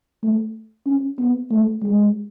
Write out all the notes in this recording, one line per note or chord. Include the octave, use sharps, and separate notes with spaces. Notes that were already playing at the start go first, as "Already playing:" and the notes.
A3
C#4
B3
A3
G#3